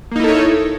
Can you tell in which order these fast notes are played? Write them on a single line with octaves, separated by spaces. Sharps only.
A#3 D#4 E4 A4 C#5